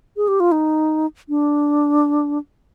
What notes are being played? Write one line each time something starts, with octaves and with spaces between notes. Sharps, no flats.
G#4
G4
F4
D#4
D4